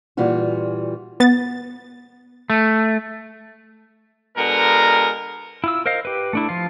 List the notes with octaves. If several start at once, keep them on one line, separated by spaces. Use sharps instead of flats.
A#2 E3 G3 F4 F#4
B3 A6
A3
B2 D3 G#3 B3 A#4
E4 F4 E6
A#4 C5 D#5 F5
G4 B4
A3 D4 E4
F3 F4